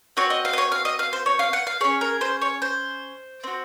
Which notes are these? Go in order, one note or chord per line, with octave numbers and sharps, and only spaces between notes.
C4 F#4 C#5
D#5
F5
D#5
C#5
F5
D#5
F5
C5
C#5
F5
F#5
F5
C#4 G#4 C#5
A#4
C5
C#5
C5
C4 F#4